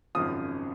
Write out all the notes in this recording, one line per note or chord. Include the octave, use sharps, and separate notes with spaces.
G#1 F#2 C#3 F3 D#6